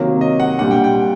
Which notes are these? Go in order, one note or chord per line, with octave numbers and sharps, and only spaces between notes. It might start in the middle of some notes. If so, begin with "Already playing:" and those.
Already playing: C3 D#3 F#3 A#3
D#5
F#5
A#2 G3 D4 F#5
G5
G5